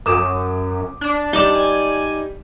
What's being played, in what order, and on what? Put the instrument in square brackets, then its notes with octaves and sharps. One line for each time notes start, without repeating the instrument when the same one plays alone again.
[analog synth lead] F#2 [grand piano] D6 D#6 E7
[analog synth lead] D4
[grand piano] G3 E7 [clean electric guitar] D#4 D5
[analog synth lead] G#5